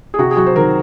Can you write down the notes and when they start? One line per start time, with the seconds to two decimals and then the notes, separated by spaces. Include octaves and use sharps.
0.14 G#4
0.19 C3 F#4
0.31 G#4
0.36 F#3 F#4
0.46 C5
0.56 D#3 A#4